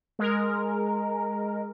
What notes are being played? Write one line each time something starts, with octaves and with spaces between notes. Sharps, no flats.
G#3 A#4